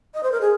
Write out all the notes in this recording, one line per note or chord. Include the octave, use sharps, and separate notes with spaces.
D#5
C5
A#4
G#4